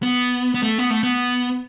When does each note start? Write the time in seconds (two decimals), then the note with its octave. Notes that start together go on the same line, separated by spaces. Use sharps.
0.03 B3
0.54 B3
0.63 A3
0.78 B3
0.90 A3
1.03 B3